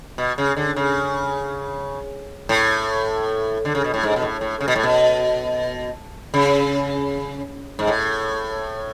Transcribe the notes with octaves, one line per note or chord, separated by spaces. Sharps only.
B2
C#3
D3
C#3
A2
D3
C#3
B2
A2
G#2
B2
A2
A2
C#3
B2
A2
B2
C#3
G#2
A2